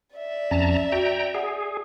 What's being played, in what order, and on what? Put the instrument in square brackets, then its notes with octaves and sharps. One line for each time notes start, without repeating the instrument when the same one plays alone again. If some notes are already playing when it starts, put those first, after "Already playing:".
[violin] D5 E5
[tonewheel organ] F2 A5 A#5 [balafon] C#4
[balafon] F#4 [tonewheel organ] G5 A#5
[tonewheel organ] G#4 [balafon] F#5